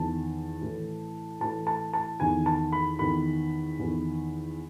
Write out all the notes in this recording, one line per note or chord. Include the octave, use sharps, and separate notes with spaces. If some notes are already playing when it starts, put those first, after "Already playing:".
Already playing: E2 D#3 A5
A2 E3
A2 E3 A5
A5
A5
E2 D#3 G#5
A5
B5
E2 D#3 B5
E2 D#3